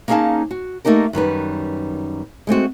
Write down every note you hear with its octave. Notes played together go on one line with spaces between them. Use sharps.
A#3 C#4 D#4 G#4 F5 A5
F#4
A3 A#3 D#4 G4 A#4
F#2 D#3 G3 B4
G#3 A3 C4 F#4